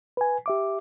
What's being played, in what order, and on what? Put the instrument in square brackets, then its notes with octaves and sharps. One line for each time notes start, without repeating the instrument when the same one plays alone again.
[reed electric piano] B4 G#5
G4 E5 D6